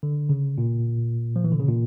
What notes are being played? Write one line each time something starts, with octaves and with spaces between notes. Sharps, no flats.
D3
C#3
A#2
F3
E3
D3
C#3
A#2